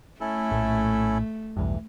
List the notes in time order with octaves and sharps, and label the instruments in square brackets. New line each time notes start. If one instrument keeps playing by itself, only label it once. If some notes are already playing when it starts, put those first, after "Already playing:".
[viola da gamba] A3 [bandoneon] C#4 E4 A4
[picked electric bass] A#1 A2
[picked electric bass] B1 E2 G2 [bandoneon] E3